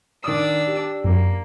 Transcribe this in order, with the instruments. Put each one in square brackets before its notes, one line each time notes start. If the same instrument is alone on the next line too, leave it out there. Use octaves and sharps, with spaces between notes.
[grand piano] D#3 D#6 [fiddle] D4 E6
[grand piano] G4
[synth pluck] F#2 [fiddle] A#3